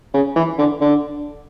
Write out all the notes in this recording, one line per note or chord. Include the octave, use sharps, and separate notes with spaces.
C#3
E3
D3
D3